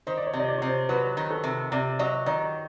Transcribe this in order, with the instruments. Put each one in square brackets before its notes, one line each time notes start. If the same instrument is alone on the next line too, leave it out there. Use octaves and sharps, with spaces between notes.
[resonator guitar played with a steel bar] D#3 [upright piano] C5
[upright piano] D5
C#5
[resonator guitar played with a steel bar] C3
[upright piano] D#5
D5
[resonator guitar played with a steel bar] C3 [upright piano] C#5
[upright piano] C5
[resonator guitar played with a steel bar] F#3 [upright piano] B4
[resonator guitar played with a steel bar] D#3
[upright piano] A4
[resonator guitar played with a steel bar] C3
[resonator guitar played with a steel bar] C3 [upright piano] D5
[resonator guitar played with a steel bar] F#3 [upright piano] D#5
[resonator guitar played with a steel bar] D#3 [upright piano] D#5